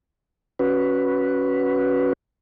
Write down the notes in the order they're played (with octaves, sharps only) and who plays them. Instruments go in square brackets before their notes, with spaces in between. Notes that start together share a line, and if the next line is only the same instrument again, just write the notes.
[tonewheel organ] C#4 F#4 B4